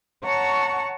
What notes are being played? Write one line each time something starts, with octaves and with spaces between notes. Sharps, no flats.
C#5 F#5 A5 A#5 C#6